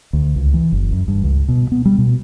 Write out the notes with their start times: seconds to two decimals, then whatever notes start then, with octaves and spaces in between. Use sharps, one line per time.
0.13 D2
0.36 C#2
0.54 E3
0.72 F#1
0.92 F#2
1.08 G2
1.24 C#2
1.48 B2
1.72 B3
1.85 G3
1.98 B2